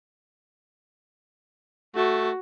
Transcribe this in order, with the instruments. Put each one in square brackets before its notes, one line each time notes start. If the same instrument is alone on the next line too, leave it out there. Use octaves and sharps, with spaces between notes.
[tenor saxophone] A3 [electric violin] F#4